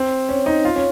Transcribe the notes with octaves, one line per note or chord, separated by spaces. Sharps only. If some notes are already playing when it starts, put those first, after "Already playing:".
Already playing: C4
C#4
D#4
F4
C#4